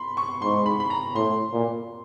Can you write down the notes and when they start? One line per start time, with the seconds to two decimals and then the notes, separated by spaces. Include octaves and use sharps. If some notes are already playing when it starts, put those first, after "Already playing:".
Already playing: B5 C6
0.17 C#6
0.42 G#2 C6
0.66 B5
0.80 B5
0.90 A#5
1.15 A2 C6
1.52 A#2